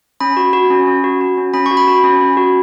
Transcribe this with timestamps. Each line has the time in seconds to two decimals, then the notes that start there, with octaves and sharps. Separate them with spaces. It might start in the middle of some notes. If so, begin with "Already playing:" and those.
0.20 C#4 B5
0.37 F#4
0.53 F#4
0.70 C#4
0.87 C#4
1.04 F#4
1.21 F#4
1.37 C#4
1.54 C#4 B5
1.66 C#6
1.71 F#4
1.77 B5
1.88 F#4
2.04 C#4
2.21 C#4
2.37 F#4